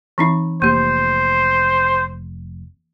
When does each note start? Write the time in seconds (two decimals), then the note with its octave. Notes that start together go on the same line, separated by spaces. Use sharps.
0.18 E3 C4 D#4
0.62 F1 A#3 G4 C5